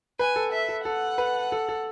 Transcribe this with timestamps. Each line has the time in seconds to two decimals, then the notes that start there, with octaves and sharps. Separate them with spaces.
0.19 B4 G#5
0.36 A4
0.52 E5
0.69 A4
0.85 A4 F#5
1.18 B4
1.52 A4
1.69 A4